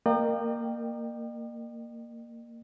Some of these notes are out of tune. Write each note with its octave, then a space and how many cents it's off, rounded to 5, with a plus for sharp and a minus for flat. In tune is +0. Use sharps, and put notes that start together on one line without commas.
A#3 -10 D#5 -45 G5 +0